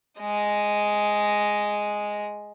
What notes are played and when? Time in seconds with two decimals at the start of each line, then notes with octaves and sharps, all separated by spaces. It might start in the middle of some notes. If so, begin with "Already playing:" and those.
0.20 G#3 D#5